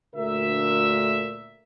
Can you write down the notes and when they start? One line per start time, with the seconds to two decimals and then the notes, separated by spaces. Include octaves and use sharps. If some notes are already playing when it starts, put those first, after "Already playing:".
0.15 D2 A#2 A#4 E5